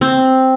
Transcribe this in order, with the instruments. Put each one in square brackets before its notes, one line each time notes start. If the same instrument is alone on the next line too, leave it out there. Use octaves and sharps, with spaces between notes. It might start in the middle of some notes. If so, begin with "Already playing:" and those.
[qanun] C4